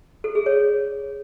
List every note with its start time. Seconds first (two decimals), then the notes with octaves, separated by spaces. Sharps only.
0.24 A4
0.35 G#4
0.46 C#5